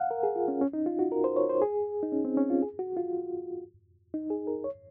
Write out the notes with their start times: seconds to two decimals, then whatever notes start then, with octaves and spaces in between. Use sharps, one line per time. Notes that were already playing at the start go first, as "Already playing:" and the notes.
Already playing: F5 F#5
0.11 A#4
0.23 G#4
0.36 F4
0.48 C#4
0.61 C#4
0.73 D#4
0.86 F4
0.99 F#4
1.12 A#4
1.24 C5
1.36 C#5
1.49 C5
1.62 G#4
2.03 D#4
2.12 C#4
2.25 C4
2.37 C#4
2.50 F4
2.62 G#4
2.79 F#4
2.97 F4
4.14 D#4
4.30 G#4
4.47 A#4
4.64 C#5